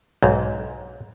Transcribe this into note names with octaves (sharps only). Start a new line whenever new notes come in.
B1 G#2